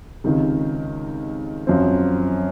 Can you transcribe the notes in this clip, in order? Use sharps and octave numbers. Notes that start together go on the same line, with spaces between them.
C#2 C3 D#3
F#2 F3 C4